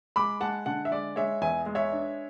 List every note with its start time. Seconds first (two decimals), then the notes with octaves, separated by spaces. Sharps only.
0.16 G#3 B5 D6
0.41 G#3 F#5 A5
0.66 D3 F#5 A5
0.85 E5
0.91 G#3 D5
1.16 G#3 C#5 E5
1.41 E2 E5 G#5
1.66 G#3
1.75 C#5 E5
1.92 D4